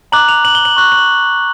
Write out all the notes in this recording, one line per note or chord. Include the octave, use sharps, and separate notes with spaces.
A#5 D6 F#6 F#7
F7
F#7
G7
F#7
C#6 F#6
F#7